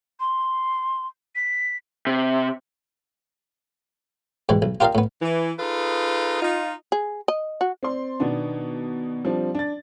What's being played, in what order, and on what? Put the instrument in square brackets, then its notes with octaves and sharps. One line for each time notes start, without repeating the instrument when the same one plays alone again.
[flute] C6
B6
[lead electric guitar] C3
[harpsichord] G#2 B2 E3 G3
B1
F4 G4 A#4 D5 D#5 F5
A2 B3
[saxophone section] E3
D#4 F4 G#4 A4 B4
D#4 F4
[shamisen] G#4
D#5
F#4
[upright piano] C4 D5 C6
B2 D#3 B3 D4
F3 G3 C4 D4
D4 A6